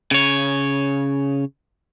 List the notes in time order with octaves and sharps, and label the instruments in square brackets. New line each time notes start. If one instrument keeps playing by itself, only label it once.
[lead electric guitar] C#3 C#5